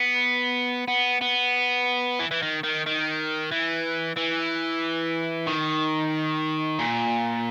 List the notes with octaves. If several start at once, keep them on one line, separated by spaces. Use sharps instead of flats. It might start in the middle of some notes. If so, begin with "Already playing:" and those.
Already playing: B3
B3
B3
E3
E3
D#3
D#3
D#3
E3
E3
D#3
A#2